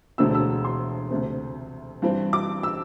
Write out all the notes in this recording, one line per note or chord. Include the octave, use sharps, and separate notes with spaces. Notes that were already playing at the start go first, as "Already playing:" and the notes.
E1 D2 D3 A3 C4 E6
E6
C6
D2 C3 A3 C4
G2 E3 C4
D6
E6